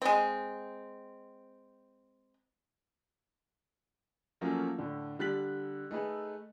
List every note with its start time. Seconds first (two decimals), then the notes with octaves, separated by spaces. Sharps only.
0.02 G#3 C4
4.41 F3 F#3 A3 A#3 C#4 F4
4.78 A2 D3
5.19 D3 G3 F#6 A6 B6 F#7
5.91 A3 D#4 G#4 A4 B4